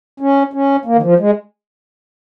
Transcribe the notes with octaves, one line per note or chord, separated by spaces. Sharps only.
C#4
C#4
A#3
D#3
F3
G#3